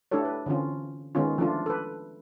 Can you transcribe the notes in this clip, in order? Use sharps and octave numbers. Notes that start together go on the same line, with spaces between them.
A3 D4 E4 G4 A4 C#5
B4
D3 E3 C4 C#4 F4
D#3 G#3 B3 C#4 F4
F3 A3 D4 F4
A4 B4